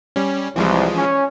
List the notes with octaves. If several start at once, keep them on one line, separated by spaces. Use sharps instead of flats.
G3 C#4
C2 E3 F3 G#3
C#4